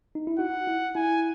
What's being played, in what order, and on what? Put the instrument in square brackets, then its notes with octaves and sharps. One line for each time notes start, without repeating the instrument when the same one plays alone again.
[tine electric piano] D#4
E4
[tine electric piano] F#4 [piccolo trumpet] F#5
[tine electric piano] E4
[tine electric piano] E4 [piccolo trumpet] G#5